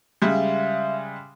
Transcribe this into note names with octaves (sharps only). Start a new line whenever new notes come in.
C#3 G3 G#3 E5 F5